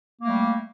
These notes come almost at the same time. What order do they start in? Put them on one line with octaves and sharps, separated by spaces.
A#3 A3 G3